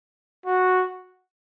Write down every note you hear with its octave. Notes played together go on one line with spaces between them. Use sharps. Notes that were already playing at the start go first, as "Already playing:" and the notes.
F#4